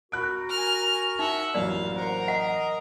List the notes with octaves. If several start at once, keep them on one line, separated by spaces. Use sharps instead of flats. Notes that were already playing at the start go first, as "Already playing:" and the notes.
F#4 A#4 B5 F#6 D7
G#5 F6
D#4 E5 F#5
A1 F#2 A#3 D5 F5
A#4 C5 F#5
D#5 F#5